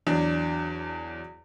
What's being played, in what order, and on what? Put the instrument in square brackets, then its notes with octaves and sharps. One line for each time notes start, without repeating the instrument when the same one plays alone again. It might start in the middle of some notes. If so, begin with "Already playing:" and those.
[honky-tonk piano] E2 F#3 D4